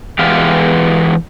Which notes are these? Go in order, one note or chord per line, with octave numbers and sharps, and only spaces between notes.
E3 G#3 B3 G4 F5